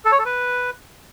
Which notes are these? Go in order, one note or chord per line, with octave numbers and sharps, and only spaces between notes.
A4
C#5
A4
B4